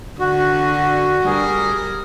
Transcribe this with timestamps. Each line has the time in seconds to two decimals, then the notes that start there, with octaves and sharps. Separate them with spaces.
0.20 D3 F#4
1.25 G3 G#4 A#4